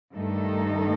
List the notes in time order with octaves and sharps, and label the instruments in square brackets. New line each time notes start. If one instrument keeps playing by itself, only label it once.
[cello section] G2 D#3 A3 D#4 A4